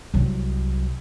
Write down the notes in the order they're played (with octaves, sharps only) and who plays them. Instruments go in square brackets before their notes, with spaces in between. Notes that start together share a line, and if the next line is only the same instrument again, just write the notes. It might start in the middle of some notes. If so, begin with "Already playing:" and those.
[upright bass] C2 F#3